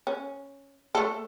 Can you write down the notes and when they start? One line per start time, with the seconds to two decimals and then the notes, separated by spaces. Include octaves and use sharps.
0.07 C#4
0.95 A3 A4